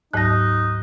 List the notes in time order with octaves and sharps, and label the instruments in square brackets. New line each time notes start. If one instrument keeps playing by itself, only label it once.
[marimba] D2 G#2 F#3 [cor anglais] D#4 [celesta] F#6 A#6